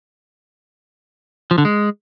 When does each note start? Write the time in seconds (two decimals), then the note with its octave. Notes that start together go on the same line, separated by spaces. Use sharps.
1.51 F3
1.58 D3
1.65 G#3